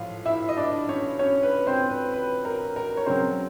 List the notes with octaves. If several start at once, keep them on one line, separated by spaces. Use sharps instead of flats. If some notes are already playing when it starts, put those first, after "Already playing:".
Already playing: A2 F3 F4 F5
E4 E5
D#5
D4 D5
C#4 C#5
C#4 C#5
B4
C4 C5
B4
B4
A#4
A#4
C#5
C#3 F#3 C4 C5